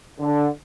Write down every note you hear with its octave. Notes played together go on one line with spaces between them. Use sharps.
D3